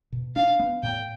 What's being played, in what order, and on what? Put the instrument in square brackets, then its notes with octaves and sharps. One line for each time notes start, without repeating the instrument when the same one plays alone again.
[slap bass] B2
[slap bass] D4 [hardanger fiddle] F5
[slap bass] B3
[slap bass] A2 [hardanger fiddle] G5